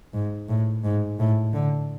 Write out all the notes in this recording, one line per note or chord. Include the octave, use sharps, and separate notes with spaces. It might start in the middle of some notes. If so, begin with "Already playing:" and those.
G#2
A2
G#2
A2
D3